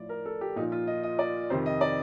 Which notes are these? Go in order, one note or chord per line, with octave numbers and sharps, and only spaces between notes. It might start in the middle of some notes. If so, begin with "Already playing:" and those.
Already playing: A2 F3 D5
A#4
A4
G4
A#2 F3 D#4
F4
D#5
D#5
D5
F2 C3 D#3 C5
D#5
D5